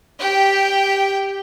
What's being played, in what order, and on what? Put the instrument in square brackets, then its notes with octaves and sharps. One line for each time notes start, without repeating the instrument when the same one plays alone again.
[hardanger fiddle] G4 [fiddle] G5